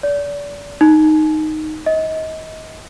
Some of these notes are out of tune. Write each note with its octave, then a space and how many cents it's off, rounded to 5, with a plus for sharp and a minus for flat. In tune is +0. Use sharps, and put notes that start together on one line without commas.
D5 -30
D#4 -5
D#5 +30